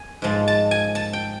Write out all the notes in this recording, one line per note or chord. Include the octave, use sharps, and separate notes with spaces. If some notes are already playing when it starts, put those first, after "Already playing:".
Already playing: G#5
G#2 F3 G#3 A5
A5
G#5
A5
G5